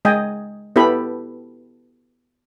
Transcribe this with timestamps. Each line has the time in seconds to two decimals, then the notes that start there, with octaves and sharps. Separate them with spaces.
0.05 G#3 D#5 G5 G#5
0.76 B3 E4 G4 A4 B4 B5